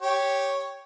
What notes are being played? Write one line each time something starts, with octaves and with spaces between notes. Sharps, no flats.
G4 C#5